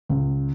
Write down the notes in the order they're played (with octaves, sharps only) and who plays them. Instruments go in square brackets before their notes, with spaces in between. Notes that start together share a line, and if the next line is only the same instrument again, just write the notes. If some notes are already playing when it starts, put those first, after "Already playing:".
[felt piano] C#2